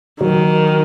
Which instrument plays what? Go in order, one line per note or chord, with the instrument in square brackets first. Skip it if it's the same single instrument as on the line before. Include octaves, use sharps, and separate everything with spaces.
[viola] D#3 [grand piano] F#3